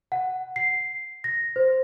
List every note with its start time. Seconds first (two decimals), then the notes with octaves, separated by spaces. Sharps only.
0.12 F#5
0.56 C7
1.24 A#6
1.56 C5